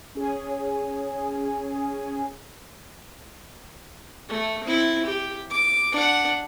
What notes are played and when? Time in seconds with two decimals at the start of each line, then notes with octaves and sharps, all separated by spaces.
0.15 C#4 G#4
4.29 A3
4.64 C4 E4
5.06 G4
5.51 D6
5.92 D4 F#5